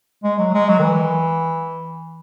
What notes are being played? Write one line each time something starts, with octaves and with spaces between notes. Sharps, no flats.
G#3
F#3
G#3
F#3
D#3
E3